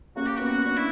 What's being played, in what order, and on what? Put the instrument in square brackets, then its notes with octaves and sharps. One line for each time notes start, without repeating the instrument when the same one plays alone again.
[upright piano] A#3 C#4 [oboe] F#4
[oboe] G4
F#4
[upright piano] B3
[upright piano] C#4 [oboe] F#4
[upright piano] D4 [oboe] F#4
[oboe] E4